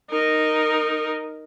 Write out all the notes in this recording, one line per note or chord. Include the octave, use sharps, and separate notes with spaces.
D#4 A#4